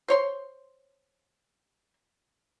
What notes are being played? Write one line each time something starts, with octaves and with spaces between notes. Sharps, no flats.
C5 C#5 C6